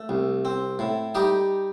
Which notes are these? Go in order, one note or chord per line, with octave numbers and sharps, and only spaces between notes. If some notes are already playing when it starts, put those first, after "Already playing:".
Already playing: A3
C2
C4
A2
G3 D#4 G4